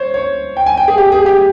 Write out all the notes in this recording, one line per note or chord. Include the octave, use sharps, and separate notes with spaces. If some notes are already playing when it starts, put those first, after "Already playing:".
Already playing: C5 C#5
C#5
G5
G#5
G5
G#4
G4
G#4
G4